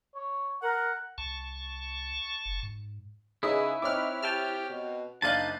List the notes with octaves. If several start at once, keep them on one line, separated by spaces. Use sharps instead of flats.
C#5
A#4 F#5
C2 A5 C#6
F#1
G#2
C#3 D#4 E4 G#4 B4 C#5 D#6
C4 D#4 C#5 D6 F6 F#6
G4 G5 A5 F6
B2
F#1 D4 D#4 F5 A5 F#6 G6 D#7